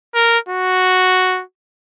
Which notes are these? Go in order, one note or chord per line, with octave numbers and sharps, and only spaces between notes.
A#4
F#4